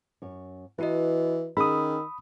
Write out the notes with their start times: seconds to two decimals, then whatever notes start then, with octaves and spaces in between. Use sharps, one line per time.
0.22 F#2 C#5
0.79 E3 E4 F#4 B4 D#5
1.57 D#3 C#4 D#4 G#4 B5 D#6 E6